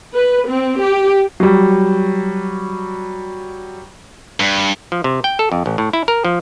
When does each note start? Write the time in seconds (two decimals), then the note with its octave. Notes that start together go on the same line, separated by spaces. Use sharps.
0.15 B4
0.47 C4
0.81 G4
1.40 F#3 G3
4.40 G2
4.92 F3
5.04 C3
5.24 G5
5.39 A4
5.52 F2
5.66 A1
5.78 A2
5.93 E4
6.08 A#4
6.25 F3